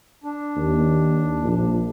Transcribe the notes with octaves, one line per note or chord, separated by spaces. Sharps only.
D4
D#2
A#1